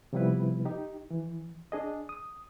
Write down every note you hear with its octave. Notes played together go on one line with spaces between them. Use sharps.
C3 F3 G3 B3 E4 B4
D#4 G4
E3
D4 G#4 D#5
D#6